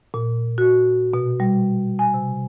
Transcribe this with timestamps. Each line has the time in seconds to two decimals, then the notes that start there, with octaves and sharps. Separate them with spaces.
0.14 A#2
0.58 F#4
1.14 B2
1.40 G3
1.99 G#5
2.14 C3